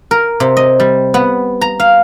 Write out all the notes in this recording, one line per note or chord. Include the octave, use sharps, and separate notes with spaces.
A#4
C3
D#5
G3
B3
A#5
F5